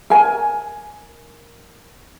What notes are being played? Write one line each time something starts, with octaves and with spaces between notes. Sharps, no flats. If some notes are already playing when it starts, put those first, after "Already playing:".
A#4 G#5